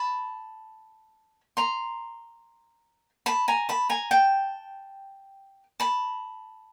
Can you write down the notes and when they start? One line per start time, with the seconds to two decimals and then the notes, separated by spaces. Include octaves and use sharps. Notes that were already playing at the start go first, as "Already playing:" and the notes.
Already playing: A5 B5
1.57 A#5 C6
3.26 A5 B5
3.48 G#5 A#5
3.69 A5 B5
3.89 G#5 A#5
4.11 G5 A5
5.80 A5 B5